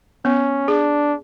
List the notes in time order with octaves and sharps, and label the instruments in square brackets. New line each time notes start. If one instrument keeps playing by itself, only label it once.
[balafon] B3 [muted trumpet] C#4
[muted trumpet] D4 [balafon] G#4